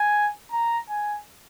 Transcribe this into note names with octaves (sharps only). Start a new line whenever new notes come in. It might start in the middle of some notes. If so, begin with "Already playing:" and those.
Already playing: G#5
A#5
G#5